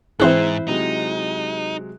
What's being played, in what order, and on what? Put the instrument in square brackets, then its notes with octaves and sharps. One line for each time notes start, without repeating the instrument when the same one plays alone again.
[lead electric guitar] G#2 [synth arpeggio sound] E3 C4 G#4 [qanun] E4 C5 [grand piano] F#6
[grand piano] C3 F#3 G#3 [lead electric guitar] D#4